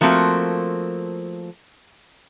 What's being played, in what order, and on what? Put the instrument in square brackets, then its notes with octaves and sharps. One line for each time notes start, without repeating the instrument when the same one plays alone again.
[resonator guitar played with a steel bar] F3 A3 A#3 C4 F#4